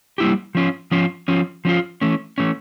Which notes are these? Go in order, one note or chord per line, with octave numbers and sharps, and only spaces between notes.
G3 A#3 E4 G4
F3 C#4 F4
F3 C#4 F4
F3 C#4 F4
F3 C#4 F4
E3 A3 C#4
E3 A3 C#4